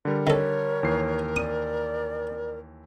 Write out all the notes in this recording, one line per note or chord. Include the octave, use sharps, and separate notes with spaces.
D3 G3 A#4
D#3 A4 C#5
D#2 E3 C7
D5 D#6